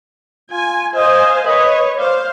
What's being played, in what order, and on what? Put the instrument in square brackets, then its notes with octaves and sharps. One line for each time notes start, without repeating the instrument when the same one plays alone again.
[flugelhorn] F4 [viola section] G#5
[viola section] C5 F5 G#5 [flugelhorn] D#5
[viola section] B4 C#5 [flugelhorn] D#5
[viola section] C5 F5 [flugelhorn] D5